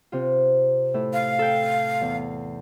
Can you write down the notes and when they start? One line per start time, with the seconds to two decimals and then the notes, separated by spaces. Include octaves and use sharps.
0.12 C3 F4
0.94 A2 E4
1.13 F5
1.39 A4 G5
2.01 E2